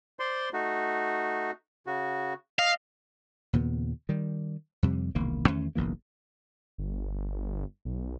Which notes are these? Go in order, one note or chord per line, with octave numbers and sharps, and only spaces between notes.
C5 D5 C6
A3 D#4 F#4
C#3 F#4
D#5 F5
D#2 A#2 C#3 B3
D#3 G3
F2 C3 G3
E1 C2 D#3 A#3
E2 D#3 A3 C#4
F#1 B1 E3 A#3
G1
B1